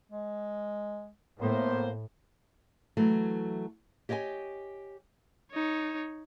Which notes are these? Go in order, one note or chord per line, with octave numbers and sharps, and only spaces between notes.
G#3
A2 A#3 B3 C5
E3 F#3 A3
G4 C#5 D#5 E5 G#5
D#4 C#5